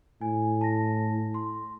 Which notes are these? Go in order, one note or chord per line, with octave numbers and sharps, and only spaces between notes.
A2 G#5
A5 A#6
C6